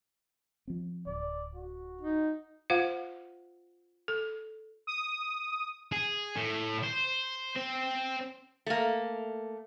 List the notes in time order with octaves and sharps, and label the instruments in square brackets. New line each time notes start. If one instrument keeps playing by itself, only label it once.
[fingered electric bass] F3 C4
[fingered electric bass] D1 [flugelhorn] D5
[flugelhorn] F#4
[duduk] D#4
[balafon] F4 C5 F5 F#5
A4
[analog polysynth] D#6
[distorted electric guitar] G#4
A2
C5
C4
[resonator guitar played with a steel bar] A3 A#3